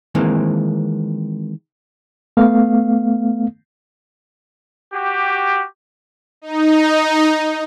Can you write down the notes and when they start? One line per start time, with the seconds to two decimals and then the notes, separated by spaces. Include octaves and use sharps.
0.15 D#3 E3 G#3 A#3 C4
2.37 A3 B3 F5
4.93 F#4 G4
6.42 D#4